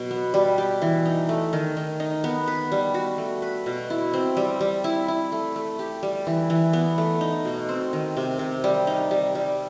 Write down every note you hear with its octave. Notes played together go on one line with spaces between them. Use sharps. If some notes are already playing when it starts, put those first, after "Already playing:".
Already playing: B2 F#3
B3
G3
G4
E3
D#4
A3
D#3
D#3
D#4
B3
B4
G3
F#4
A3
B4
B2
E4
C4
G3
G3
E4
E4
A3
A3
G4
G3
E3
E3
B3
A3
D#4
B2
C4
D#3
C3
C3
G3
D#4
G3
G3